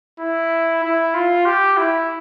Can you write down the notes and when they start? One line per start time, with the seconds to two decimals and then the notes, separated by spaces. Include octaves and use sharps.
0.20 E4
0.83 E4
1.14 F4
1.46 G4
1.77 E4